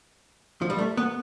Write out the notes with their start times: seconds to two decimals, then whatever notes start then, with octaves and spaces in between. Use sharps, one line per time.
0.62 F3
0.70 G3
0.78 A3
0.97 B3